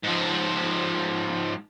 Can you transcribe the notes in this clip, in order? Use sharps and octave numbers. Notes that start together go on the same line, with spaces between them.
G#2 F3